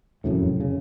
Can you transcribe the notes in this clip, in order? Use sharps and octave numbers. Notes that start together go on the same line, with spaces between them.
F1 F#2 A2
C#3